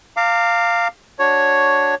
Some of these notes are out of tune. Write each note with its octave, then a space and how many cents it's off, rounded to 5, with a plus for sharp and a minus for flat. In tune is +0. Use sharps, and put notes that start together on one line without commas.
F5 +0 A#5 -35 D6 +0
D4 +0 F#4 +0 C#5 +0